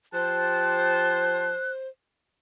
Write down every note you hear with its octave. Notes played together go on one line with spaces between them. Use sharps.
F3 G4 C5 A5 F#6